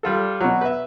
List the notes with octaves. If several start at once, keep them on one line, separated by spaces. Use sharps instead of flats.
G3 F4 A4
B2 F#3
B4 E5